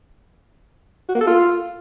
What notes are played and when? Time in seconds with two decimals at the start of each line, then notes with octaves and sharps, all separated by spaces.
1.09 F#4
1.15 A#3
1.21 A4
1.27 F4